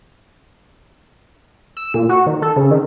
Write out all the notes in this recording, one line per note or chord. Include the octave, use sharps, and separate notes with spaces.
E6
A#2
F#4
D#3
A4
C#3
D#3